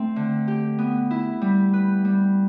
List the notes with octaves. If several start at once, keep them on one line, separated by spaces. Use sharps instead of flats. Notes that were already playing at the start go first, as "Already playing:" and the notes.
Already playing: A3 C4
D3
G4
B3
E4
G3
B4
G3